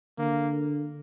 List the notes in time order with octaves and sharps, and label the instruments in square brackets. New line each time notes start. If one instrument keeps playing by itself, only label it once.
[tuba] D3 [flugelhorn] A#3